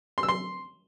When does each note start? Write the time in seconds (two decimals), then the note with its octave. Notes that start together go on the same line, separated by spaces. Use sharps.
0.18 C6
0.23 E6
0.29 C6